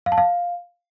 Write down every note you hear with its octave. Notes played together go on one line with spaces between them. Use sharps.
F5
A5
F5